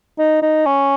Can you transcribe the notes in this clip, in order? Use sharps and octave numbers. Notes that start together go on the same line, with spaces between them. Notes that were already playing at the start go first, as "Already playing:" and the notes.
D#4
D#4
C#4